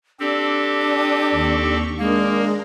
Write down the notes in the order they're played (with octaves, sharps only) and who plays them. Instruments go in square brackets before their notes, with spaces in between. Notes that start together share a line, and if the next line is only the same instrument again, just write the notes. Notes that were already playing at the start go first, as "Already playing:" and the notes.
[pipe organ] C4 G4 A4 [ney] D4
[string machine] G5 D#6
D#2 C#6
[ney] G#3 [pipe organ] A#3 [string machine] D4 A#4